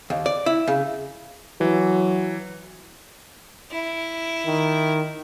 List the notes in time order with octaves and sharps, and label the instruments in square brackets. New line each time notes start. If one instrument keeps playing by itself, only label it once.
[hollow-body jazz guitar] D#2
D5
E4
C#3
[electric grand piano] E3 [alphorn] F#3
[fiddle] E4
[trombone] D#3